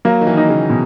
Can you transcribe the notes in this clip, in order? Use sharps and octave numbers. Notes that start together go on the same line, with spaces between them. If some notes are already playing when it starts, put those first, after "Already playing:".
F#3 A#3
D#3
E3
D#4
C#3
B2